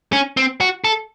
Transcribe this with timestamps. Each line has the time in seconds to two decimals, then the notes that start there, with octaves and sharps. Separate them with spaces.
0.13 C#4
0.37 C4
0.61 F#4
0.84 A4